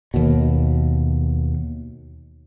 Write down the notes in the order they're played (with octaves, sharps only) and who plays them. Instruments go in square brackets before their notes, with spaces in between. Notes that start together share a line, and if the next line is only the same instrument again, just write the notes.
[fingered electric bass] D#2 B2